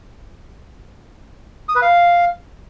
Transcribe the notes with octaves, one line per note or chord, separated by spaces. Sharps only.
D#6
B4
F5